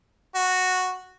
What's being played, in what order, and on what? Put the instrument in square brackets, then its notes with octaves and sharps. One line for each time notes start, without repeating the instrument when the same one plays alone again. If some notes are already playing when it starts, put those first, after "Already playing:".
[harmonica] F#4